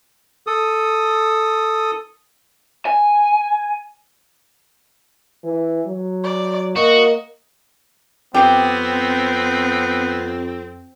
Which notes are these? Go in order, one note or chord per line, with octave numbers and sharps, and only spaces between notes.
A4 D#6
G#5
E3
F#3
D5
A#3 F#4 D#5
F2 B3 C4 G4